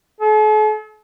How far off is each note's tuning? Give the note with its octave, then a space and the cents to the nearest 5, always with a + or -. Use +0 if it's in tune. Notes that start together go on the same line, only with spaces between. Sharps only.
A4 -45